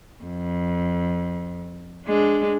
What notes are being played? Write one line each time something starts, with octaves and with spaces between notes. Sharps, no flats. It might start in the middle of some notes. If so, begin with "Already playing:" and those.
F2
G#3 D4